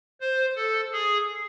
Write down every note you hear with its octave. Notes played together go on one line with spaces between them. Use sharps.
C5
A4
G#4